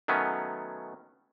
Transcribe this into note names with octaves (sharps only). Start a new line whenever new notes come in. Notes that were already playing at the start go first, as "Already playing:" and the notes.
D#3 F#3 A3 B3 C#4